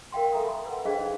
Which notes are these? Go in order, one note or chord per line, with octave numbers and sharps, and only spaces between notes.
A#4 F5 G5 C6
A4 E5 G#5 A#5 D#6
B5 C6
B4 F#5
D4 G#4 C5 D#5 F5 G5
D#4